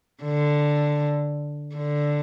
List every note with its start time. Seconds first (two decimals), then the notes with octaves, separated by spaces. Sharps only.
0.24 D3
1.76 D3